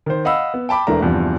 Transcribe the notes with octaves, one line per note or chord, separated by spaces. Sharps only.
D#3 C5
D#5 F5 F#5 B5 E6
B3
G5 A5 B5 D6
E1 E3 A3 D4 A#4 A#5
E2 G2 C3 F3